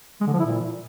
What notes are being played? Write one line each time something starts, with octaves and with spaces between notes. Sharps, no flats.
G#3
D3
F3
E4
A#2